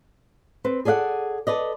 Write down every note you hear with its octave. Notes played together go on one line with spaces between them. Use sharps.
C4 B4
G#4 A4 D5 E5 F#5
A4 B4 D5 D#5